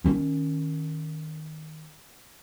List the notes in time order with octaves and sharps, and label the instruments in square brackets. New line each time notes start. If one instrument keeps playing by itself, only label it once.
[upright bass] D#3 C#4